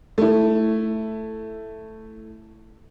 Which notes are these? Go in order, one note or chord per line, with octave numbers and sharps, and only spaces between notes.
A3 E4